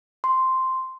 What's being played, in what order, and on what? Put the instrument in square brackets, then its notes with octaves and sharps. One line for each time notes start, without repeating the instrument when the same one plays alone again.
[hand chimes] C6